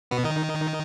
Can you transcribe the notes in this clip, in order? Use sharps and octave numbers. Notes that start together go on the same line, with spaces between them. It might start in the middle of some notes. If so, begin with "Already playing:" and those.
B2 B3
D#3 D#4